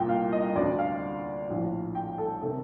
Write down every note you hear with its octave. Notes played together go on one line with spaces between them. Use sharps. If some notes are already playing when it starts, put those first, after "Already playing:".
Already playing: C2 A#2 G5
F5
D#5
D2 D3 D5
F5
A#1 A2
G5
A4
C3 D#3 A4